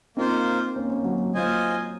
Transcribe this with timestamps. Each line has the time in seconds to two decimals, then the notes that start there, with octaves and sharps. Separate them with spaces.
0.17 A#3 C4 D#4 F4 C5
0.76 A#3 C#4
0.90 A#3 C#4
1.04 F#3 A#3
1.34 F#3 A#3 F4 C5 D#5 G#5